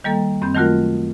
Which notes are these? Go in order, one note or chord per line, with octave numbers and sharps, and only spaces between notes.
D#3 G3 A#3 A4
F#2 C4 B5 G6
D#3 F#3 A3 F4 F#4 A#4